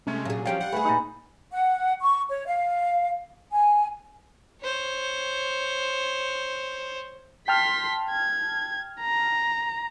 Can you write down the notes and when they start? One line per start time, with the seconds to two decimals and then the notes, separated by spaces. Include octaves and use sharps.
0.07 C3 G#3 A3 C#4
0.25 A#2 F#3 G#4
0.46 F3 C#4 G4 F5 G5
0.61 G3 F#5
0.72 A3 G#4 B4 G#5
0.85 A#2 D#4
1.51 F#5
2.01 C#6
2.30 C#5
2.46 F5
3.51 G#5
4.62 C5 C#5
7.48 G5 A5 C6 F6 B6
8.10 G#6
9.01 A#5